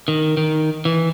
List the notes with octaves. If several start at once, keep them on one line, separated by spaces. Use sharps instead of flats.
D#3
D#3
E3